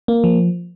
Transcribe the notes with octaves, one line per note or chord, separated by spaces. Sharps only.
A#3
F3